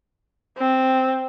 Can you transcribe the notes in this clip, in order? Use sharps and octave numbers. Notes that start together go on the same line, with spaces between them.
C4